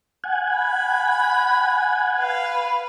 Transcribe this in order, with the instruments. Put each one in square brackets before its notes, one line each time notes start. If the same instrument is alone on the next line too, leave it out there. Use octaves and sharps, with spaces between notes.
[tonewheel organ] F#5 G#5
[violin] B5
B4 F5